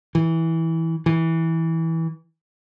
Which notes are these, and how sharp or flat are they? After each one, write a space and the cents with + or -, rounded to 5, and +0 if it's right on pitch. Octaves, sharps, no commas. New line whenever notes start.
E3 -15
E3 -15